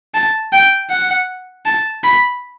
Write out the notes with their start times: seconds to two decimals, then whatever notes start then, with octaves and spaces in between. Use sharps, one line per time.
0.15 A5
0.53 G5
0.90 F#5
1.66 A5
2.04 B5